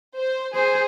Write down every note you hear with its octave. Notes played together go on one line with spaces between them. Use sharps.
C5
G#4 C5